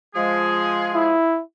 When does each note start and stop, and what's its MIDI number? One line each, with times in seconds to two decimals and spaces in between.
0.15 1.13 53
0.15 1.13 56
0.15 1.13 68
0.94 1.42 64